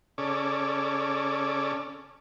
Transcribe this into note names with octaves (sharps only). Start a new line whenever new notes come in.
C#3 C#4 A4 D5